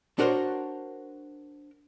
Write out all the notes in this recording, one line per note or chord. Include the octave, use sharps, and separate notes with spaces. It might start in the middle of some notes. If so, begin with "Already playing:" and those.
D4 F#4 A#4 C5 C#5